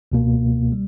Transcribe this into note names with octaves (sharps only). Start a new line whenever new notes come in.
C#2 B2 A#3
G3